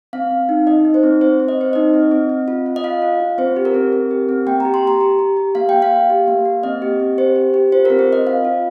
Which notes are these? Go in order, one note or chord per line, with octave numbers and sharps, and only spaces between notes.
C4 F5
C4
D#4
D#4 D#5
D#4
C5
C4
C4 C5
C4
D#5
C4 C5
D#4 D#5
C4
C4
C4
F4
F4
D#5
F4 F5
F4
F4
C4 C5
G4
A#4
C4
C4
G4
C4
A#3 G5
G4 A#5
C6
G4 A#5
G4
G4
G4
A#3 F5
A#3 G5
F5
A#3
G4
A#3
A#3
C4 D#5
G4
C4
G4 C5
G4
G4
F4 C5
C4 A#4
C5
C4 D#5
F4 F5
F4